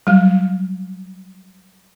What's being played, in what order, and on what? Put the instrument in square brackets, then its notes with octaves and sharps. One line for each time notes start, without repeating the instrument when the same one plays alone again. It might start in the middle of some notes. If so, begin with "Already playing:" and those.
[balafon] F#3 G3